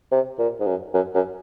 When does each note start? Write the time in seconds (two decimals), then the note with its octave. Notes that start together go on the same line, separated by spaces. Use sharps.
0.12 C3
0.39 A#2
0.60 G#2
0.66 F#2
0.94 F#2
1.15 F#2